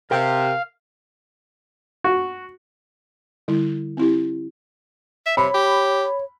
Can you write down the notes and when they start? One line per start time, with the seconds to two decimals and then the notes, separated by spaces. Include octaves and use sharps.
0.11 C3 A#4 F5 G5
2.04 F#4
3.48 D3 G3 E4
3.97 C4 E4 G4
5.26 E5
5.37 C3 C#5 B5
5.55 G4